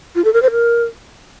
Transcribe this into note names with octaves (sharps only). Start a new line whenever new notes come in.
F4
A4
A#4
C5
A#4